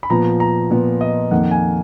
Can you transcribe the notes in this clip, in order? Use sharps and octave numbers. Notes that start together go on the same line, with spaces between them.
B5
A#2 F3 B3 A#5
A#5
A#2 F3 B3
D#5
F2 D#3 A#3 F#5
G#5